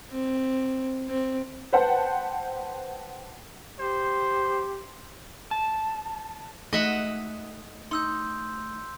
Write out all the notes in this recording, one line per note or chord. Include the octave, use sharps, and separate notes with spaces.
C4
C4
B4 C5 F#5 G5 A5
G4 C5
A5
G#3 A3 D#4 F#4 D#5 E5 F#5
D#4 C6 E6 G6